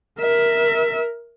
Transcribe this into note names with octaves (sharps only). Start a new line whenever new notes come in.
A#4 E5